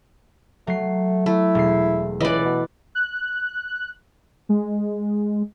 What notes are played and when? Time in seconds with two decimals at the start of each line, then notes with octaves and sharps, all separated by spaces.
0.67 F#3 A3 C7
1.26 A3 E4
1.55 E1 C7
2.21 C#2 E3 D5 D#5 B5 F#6
2.45 B2
2.95 F#6
4.49 G#3